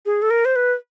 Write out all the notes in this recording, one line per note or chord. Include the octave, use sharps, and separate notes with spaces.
G#4
A4
A#4
C5
B4